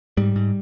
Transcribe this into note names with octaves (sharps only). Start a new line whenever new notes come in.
G#2 G3
G#2